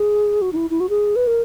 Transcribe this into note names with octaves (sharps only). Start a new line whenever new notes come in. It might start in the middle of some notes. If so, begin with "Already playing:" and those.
Already playing: G#4
F#4
D#4
E4
E4
F#4
G#4
B4
A#4